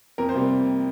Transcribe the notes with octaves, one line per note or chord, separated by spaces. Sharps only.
F2 A#4
C5
C3 G3 A#3